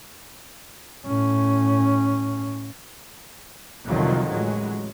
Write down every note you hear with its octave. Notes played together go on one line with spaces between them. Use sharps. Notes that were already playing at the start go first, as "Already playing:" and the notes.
A2 C#4
C2 F2 D3 D#3 F3 F#3
A1 F#3 G#3